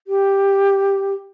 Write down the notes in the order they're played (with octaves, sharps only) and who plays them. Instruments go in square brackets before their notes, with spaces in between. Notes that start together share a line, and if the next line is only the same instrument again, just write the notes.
[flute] G4